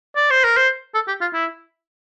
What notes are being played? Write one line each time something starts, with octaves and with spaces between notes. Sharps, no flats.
D5
C5
A#4
C5
A4
G4
F4
E4